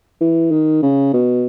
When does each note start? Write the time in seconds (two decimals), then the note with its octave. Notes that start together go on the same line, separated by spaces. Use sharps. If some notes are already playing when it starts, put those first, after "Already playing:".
0.21 E3
0.51 D#3
0.82 C#3
1.13 B2